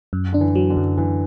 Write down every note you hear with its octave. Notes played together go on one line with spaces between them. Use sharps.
F#2
D3 D4
E3
F#3
D3
F#2
F#2 E3